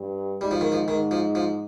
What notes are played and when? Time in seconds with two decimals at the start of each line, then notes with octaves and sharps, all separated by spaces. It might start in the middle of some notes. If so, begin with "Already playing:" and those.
Already playing: G2
0.41 G#2 G3
0.51 F3
0.61 D#3
0.72 F3
0.88 G#2 D#3
1.11 F3
1.35 F3